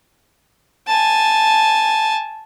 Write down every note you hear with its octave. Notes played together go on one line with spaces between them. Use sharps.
G#5 A5